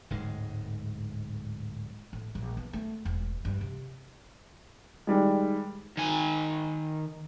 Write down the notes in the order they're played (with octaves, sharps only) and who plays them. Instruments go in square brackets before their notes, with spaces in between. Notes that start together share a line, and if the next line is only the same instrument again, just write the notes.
[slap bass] D1 G#2 G#3
[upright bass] A2
A#1
B3
A3
E1
G2
C3
[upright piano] D#3 G3 G#3
[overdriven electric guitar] D#3 G#5